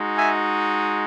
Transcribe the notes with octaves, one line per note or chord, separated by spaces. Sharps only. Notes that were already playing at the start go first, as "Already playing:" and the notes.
Already playing: G#3 D#4 F#4
E5 G#5